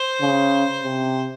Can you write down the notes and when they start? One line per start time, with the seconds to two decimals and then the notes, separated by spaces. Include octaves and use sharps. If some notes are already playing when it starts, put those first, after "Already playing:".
Already playing: C5
0.21 C#3
0.83 C3